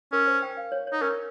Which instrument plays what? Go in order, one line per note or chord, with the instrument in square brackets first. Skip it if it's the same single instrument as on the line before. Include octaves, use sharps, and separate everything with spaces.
[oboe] C#4 [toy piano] A#4
[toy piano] C5
G5
F5
C#5
C#5
[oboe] D#4
[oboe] C#4 [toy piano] A#4